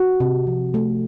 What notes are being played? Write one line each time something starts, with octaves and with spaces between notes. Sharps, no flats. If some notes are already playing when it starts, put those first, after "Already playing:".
Already playing: F#4
C3
F3
A3